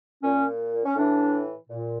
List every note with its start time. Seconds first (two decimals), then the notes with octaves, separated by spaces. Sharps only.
0.23 A#2 C#4
0.85 C#4
0.95 A2 E3 D4
1.69 A#2